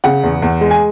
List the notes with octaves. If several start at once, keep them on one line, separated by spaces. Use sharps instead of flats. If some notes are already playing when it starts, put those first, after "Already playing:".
C#3 F#5
E2
E2
G#3
G#5